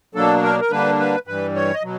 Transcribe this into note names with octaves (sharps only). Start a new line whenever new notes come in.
B2 F#3 A#3 D4 A4
A#4
A#4
D3 G3 A#3 D4 B4
B4
G2 E3 G3 B4
C#5
D#5
B2 F#3